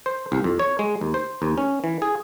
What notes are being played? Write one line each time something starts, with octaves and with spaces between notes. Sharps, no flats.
C5
C2
F2
C#5
G#3
D#2
C5
D#2
C#4
E3
G#4